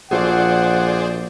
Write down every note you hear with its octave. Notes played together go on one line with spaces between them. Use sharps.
A#1 F4 F#4 G#4 A4 C5 D5 F#5